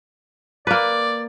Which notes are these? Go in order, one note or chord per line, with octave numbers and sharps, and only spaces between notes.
A#3 B4 D5